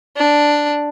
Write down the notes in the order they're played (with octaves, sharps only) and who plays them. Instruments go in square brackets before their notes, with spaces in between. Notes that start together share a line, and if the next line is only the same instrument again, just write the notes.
[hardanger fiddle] D4